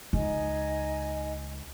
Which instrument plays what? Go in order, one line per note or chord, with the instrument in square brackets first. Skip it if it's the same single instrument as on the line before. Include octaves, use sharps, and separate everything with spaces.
[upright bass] C#2 [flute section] D#4 D#5 G#5